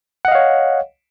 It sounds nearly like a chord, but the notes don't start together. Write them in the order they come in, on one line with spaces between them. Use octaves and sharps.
F#5 D#5 F5 C#5